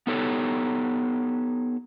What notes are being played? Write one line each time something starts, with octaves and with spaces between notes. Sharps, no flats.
B3 D#4 G4 A4 C#5